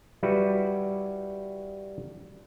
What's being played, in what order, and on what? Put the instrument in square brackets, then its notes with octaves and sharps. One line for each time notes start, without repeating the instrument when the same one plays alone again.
[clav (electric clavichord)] G3 E4 F#4 B4